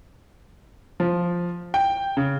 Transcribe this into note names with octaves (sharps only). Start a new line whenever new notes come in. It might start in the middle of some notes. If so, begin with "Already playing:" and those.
F3
G5
C#3